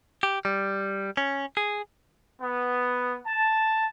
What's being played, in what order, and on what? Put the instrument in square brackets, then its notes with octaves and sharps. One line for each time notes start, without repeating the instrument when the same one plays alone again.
[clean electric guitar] G4
G3
C#4
G#4
[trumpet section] B3
A5